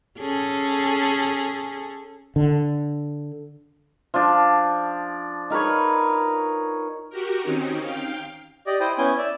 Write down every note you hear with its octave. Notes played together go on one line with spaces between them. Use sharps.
C#4 G#4 A4
D3
F3 D4
D#4 A#4 B4 C#5
F#4 G4 A#4
D#3 C4 C#4 D#4
F5 G5
G4 D5 D#5
E4 C5 G5 D#6
B3 C#4 E4 G#5 G6
D5 E5